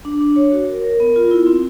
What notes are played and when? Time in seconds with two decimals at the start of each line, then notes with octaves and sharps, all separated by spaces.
0.05 D4
0.21 D4
0.36 C#5
0.52 F#4
0.68 A#4
0.84 A#4
1.00 B3
1.16 F4
1.31 E4
1.46 C4